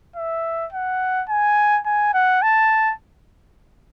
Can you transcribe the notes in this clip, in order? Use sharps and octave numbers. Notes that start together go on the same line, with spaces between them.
E5
F#5
G#5
G#5
F#5
A5